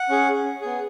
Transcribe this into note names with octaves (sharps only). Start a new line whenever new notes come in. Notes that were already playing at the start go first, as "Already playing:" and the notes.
Already playing: F#5
C#4 G#4
B3 G#4